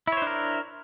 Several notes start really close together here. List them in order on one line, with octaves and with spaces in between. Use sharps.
E4 C#5 C5 D4 A#4